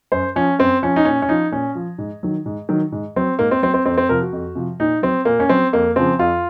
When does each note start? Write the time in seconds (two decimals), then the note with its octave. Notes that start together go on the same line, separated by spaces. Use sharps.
0.12 F#2 C5
0.36 F3 C#4
0.59 F#2 C4
0.82 F3 C#4
0.96 D#4
1.05 A#2 C#4
1.22 C#4
1.29 F3 D#4
1.52 A#2 C#4
1.75 F3
1.98 G#2
2.23 D#3 F#3
2.46 G#2
2.69 D#3 F#3
2.92 G#2
3.16 F#3 C4
3.39 G#2 A#3
3.51 C4
3.63 F#3 C4
3.74 C4
3.85 F2 C4
3.97 C4
4.09 C3 F3 A#4
4.21 F#4
4.32 F2
4.55 C3 F3
4.80 A#2 D#4
5.02 F#3 C4
5.25 A#2 A#3
5.40 C#4
5.49 F#3 C4
5.73 F2 A#3
5.96 C#3 F3 C4
6.19 F2 F4